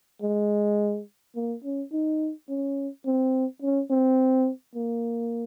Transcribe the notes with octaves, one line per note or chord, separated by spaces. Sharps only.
G#3
A#3
C#4
D#4
C#4
C4
C#4
C4
A#3